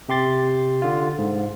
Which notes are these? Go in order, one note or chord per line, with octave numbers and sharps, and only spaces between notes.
C3 G4 C6 A6
D3 F4
G#2